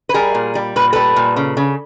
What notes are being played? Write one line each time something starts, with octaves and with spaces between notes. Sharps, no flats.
B4
G3 G#4 A#4
A#2
G3
A#2 B4
G3 A4 B4
A#2
C#3
C#3